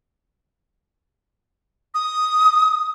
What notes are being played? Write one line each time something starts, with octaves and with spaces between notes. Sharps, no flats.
D#6